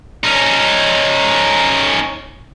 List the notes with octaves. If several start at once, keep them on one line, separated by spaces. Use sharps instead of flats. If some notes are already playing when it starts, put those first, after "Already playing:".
C#4 D#4